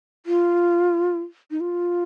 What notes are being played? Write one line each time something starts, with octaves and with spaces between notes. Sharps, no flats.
F4
D#4
F4